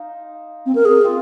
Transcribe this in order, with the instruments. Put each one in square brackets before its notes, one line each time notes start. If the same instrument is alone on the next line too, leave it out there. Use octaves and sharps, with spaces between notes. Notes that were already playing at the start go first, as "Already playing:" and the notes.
Already playing: [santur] D#4 C5 F5
[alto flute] C4
A#4
G#4
[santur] C4 F4